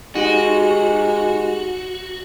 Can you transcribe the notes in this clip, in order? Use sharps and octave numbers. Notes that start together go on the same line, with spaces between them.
G#3 D#4 F#4 G4